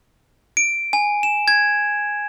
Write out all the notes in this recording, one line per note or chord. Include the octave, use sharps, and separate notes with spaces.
D7
G#5
E7
G#6